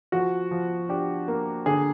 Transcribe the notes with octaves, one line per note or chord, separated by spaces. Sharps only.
F3 F#4
F3
D4 G4
A#3
D3 G#4